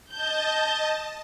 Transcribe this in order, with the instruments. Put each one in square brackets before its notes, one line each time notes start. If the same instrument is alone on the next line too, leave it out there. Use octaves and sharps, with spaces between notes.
[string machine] D#5 A5 [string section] G6